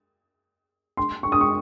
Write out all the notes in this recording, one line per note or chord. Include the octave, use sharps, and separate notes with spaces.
C6
C#6
D#6
C#6